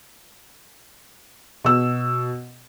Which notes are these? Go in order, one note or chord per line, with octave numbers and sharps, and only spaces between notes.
B2 E6